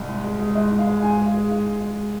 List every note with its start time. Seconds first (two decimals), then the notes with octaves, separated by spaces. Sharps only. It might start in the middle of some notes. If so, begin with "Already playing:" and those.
Already playing: C2 D#5
0.08 G#2
0.24 G#3
0.40 G#3
0.55 G#2 D#5
0.71 G#2
0.79 F5
0.87 G#3
1.02 G#2 G#5
1.18 G#3
1.26 F5
1.34 G#3
1.50 G#2 F5
1.65 G#2
1.81 G#3